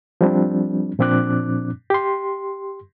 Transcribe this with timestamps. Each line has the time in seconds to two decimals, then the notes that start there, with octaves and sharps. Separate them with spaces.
0.21 F3 G3 C4 D4
0.99 A#2 F3 C4 D4 D6 F#6
1.90 G4 C6